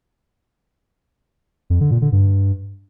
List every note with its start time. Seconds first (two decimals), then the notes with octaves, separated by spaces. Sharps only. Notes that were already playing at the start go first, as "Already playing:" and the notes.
1.70 F2
1.80 D3
1.91 A#2
2.02 D3
2.12 G2